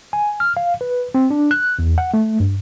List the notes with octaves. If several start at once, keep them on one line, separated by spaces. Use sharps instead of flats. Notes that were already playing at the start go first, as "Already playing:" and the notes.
G#5
F6
F5
B4
C4
D4
F#6
E2
F#5
A3
G2